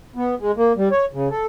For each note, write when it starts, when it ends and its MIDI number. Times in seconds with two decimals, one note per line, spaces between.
0.16 0.35 59
0.39 0.51 56
0.57 0.73 58
0.77 0.89 55
0.91 1.05 73
1.13 1.28 49
1.30 1.46 69